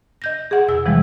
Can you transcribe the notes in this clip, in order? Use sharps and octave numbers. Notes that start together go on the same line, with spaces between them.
D#5 G6 A#6
G#4 F#5
E2 B2 E6
C3 E3 F3 G3 G#3